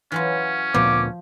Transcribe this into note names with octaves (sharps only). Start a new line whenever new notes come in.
E3 F#3 C#4 F4
D2 A#2 F3 B3 D6